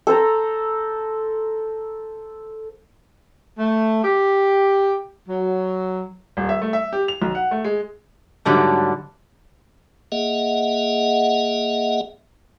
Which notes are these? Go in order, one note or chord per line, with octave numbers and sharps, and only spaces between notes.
A4 C5 A#5
A3
G4
F#3
D#1
E5
A3
E5
G4
F7
B1
F#5
A3
G#3
G#2 D3 F#3 G3 A3
A#3 G#4 D#5 E5 F#5